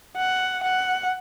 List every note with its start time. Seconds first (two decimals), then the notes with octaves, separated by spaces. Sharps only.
0.17 F#5
0.63 F#5